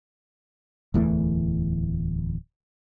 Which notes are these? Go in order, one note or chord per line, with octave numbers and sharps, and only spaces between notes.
D1 E2 E3 A3